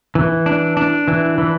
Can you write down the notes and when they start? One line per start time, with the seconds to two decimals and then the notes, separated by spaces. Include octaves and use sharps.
0.15 E3
0.46 D4
0.77 D4
1.08 E3
1.38 E3